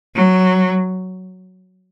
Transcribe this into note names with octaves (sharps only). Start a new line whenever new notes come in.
F#3